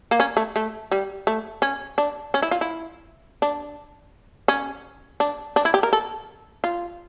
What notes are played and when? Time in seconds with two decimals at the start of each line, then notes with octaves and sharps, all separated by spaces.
0.11 A#3
0.20 C#4
0.37 A3
0.56 A3
0.92 G3
1.27 A3
1.62 C#4
1.98 D4
2.34 C#4
2.42 E4
2.51 F4
2.61 E4
3.42 D4
4.48 C#4
5.20 D4
5.56 D4
5.65 E4
5.74 G4
5.83 A#4
5.93 A4
6.64 F4